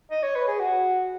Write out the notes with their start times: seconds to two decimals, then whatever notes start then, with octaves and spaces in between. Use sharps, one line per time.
0.11 D#5
0.23 C#5
0.36 B4
0.48 G#4
0.60 F#4